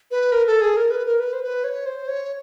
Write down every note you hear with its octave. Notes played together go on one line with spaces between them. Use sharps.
B4
A#4
A4
G#4
A#4
B4
A#4
B4
C5
B4
C#5
C5
C#5